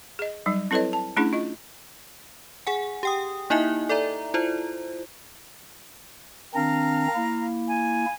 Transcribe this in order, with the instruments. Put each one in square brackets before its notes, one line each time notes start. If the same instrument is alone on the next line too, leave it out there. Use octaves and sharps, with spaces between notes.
[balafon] G#4 D#5
F#3 G3 D#4
C4 E4 A4 B4 C#5 D#5
A5
A3 C#4 D4 E4 G#4
F4 D#5
[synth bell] G#4 F#5 G#5
G4 G5 D#6
A#3 D#4 E4 D#5 E5 G#5
A4 D5 E5 A#5
E4 F4 C5
[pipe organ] D#3 C4 D4 [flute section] F5 A#5
[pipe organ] A#3 E4
[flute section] G#5